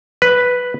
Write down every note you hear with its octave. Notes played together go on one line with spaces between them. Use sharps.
B4